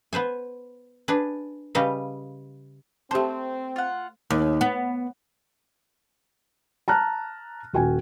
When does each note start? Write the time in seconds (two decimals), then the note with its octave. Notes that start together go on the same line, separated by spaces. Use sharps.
0.13 B3 B4 C5 G#5
1.08 D4 G#4 B4
1.75 C#3 G3 B4 D#5 F5
3.11 A3 C4 G4 C5 A5
3.76 F4 F#5
4.30 D#2
4.61 B3
6.88 A5 A#5 F6 F#6
7.73 D#1 F#4 G5 G#5